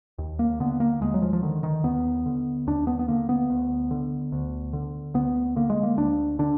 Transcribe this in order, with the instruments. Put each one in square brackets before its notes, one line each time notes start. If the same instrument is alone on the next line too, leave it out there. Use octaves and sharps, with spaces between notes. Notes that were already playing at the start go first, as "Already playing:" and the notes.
[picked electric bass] D#2
A#3
D3 B3
A#3
D#2 G#3
F#3
F3
F3
D3 D#3
D#3
D#2 B3
D3
D#2 D4
B3
B3
D3 A#3
B3
D2
D3
D2
D3
D2 B3
D3 A#3
G#3
A#3
D2 D4
D3 D4